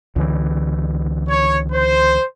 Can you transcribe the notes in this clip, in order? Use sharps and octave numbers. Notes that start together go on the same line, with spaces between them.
C#2 D3 E3
C#5
C5